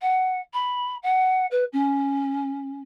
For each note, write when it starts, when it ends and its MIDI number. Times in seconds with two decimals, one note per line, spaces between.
0.02 0.40 78
0.54 0.96 83
1.03 1.46 78
1.51 1.64 71
1.73 2.82 61